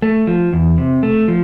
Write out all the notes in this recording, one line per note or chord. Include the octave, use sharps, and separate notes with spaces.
A3
F3
E2
C3
A3
F3